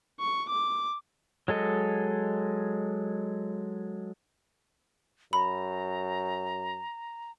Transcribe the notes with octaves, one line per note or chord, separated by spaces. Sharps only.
C#6
D6
F#3 G#3 A4 D#5
F#2 A#5 B5